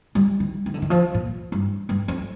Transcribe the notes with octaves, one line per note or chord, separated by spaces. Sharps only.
G3
D#3
D#3
D3
D#3
F3
A#2
G2
G2
F2